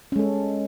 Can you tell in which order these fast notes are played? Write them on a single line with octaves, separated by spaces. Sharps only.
C#4 G#3 A4